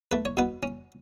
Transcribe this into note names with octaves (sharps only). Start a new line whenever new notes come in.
A3 B4
C#5
B2 B3 B4
C#4